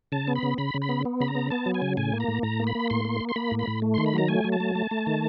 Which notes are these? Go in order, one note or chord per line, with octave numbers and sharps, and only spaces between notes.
C#3 A5
B3
B5
C#3
C#3 B5
C#3
B5
B3
B3
C#3 B5
A#5
B3
B3 A5
F#3
G#5
C#3
A2 G#5
A#3
A#5
A2
A2 A#5
A#3
B5
A#3
A2 C6
A#3
A#3
C6
A#3 B5
A2
B5
A2
A3
D#3 C6
B5
F#3 A#5
A3 G#5
F#3
A5
A3
A3
A3
D#3